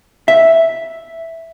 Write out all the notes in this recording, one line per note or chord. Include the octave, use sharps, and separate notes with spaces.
E5